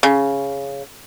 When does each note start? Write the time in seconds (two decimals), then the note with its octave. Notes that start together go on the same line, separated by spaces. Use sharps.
0.03 C#3